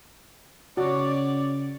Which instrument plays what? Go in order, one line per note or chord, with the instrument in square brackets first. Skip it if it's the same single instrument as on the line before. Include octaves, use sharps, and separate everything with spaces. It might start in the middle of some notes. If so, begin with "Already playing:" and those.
[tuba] C#3 [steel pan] F#4 [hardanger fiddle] C#5 [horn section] D5